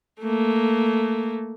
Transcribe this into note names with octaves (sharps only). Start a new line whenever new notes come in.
A3 A#3